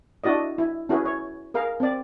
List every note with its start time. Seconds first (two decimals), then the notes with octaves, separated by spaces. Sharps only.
0.24 D4 E4 F#4 D5 D#5
0.58 E4
0.89 C#4 E4 F#4 G#4 B4
1.05 C#5
1.54 G#4 A#4 F5
1.80 C4 D5